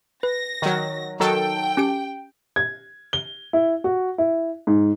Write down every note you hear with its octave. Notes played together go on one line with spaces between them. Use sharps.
B4 A#6
D#3 F#3
D#3 F#3 A4 G5
C#4 G4 D7
G#6
G7
E4
F#4
E4
G#2